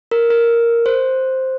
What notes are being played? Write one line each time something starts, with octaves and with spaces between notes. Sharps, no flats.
A#4
A#4
C5